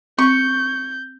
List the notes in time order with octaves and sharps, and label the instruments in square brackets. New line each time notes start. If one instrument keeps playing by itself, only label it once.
[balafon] C4 [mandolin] C#6 [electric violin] G6